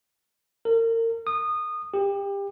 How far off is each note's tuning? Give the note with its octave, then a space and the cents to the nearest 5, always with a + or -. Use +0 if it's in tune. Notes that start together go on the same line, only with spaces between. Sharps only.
A#4 -35
D#6 -20
G4 +25